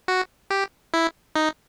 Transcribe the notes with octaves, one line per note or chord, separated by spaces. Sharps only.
F#4
G4
E4
D#4